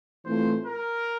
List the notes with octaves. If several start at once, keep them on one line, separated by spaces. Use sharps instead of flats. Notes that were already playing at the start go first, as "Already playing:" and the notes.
A2 E3 A3 C4 F4 C5
A#4